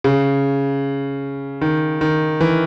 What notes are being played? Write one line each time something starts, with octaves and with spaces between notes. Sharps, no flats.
C#3
D#3
D#3
E3